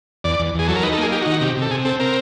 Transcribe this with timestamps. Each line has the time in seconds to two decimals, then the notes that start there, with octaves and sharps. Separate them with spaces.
0.24 E2 D5
0.39 E2
0.54 E2 G#4
0.68 F#3 A4
0.75 A#4
0.83 D#4 B4
0.93 A4
0.98 A#3 G#4
1.12 D#4 G4
1.22 F#4
1.26 D#3
1.32 F#4
1.41 C3 G4
1.56 C3
1.62 A4
1.71 C3 G#4
1.85 C4 A4
2.00 C4 A#4